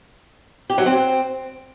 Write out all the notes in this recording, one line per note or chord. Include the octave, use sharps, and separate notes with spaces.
G4
F#3
C4